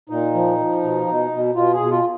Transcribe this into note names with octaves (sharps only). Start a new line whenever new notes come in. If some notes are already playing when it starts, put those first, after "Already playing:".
A#2 D#4
F3
F3
B2
B2
B2
B2 F4
G#4
B2
F4